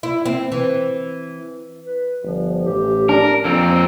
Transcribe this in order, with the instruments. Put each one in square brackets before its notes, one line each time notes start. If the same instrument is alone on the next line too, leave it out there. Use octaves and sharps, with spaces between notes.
[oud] E4
C4
E3
[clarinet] B4
[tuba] G1 [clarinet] F3
[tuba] A1 [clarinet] G4
[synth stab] D4 [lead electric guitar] A#4
[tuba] F2 [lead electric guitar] A#2 C4 [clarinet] A#5